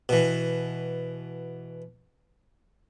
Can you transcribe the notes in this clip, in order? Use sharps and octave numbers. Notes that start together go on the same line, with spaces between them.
B2 E3